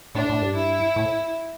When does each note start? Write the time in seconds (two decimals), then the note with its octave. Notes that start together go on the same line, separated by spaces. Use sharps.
0.15 A2 D4
0.29 A2
0.42 G2
0.56 E4
0.96 A2